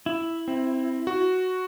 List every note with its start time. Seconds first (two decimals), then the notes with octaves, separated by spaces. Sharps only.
0.06 E4
0.48 C4
1.07 F#4